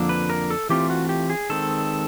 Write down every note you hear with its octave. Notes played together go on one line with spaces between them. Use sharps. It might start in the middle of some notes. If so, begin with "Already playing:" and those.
Already playing: F2 D3 F3 A#3 D4
B4
A#4
A4
E3 A3 C4 F4 G4
F#4
G4
G#4
D#3 G#3 C4 A4